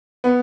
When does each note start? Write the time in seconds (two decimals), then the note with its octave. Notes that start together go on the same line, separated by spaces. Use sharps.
0.24 B3